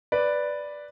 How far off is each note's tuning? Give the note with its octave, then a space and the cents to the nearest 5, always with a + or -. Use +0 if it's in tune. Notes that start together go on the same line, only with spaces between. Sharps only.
B4 +0 D5 +0